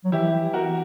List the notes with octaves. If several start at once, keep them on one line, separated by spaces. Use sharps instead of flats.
F#3
E3 E4 G4
F#4 A#4